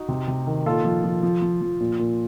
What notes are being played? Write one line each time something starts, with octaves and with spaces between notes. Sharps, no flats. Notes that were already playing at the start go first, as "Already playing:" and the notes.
Already playing: D#4 F#4
C3
C3
D#3
A#2 F4 A4
F3
F3
F3
F3
F3
A#2
A#2